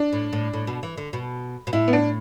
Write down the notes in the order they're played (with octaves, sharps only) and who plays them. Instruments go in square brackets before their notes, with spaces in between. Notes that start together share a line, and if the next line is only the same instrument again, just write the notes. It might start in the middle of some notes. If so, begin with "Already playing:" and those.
Already playing: [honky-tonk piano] D4
[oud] A2
A2
A2
B2
E3
D3
B2
B2
[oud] A2 [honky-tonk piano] E4
[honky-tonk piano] B3
D4